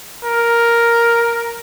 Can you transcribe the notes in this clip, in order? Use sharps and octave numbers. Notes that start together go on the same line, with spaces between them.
A#4